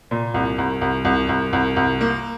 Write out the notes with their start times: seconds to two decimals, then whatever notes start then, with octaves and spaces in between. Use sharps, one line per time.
0.11 A#2
0.34 C2
0.58 C2
0.81 C2
1.05 C2
1.29 C2
1.53 C2
1.76 C2
2.01 A#3